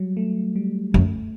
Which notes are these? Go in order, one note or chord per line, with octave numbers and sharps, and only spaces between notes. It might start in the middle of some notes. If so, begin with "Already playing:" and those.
Already playing: F#3 G3
A3
G3
F#2 A3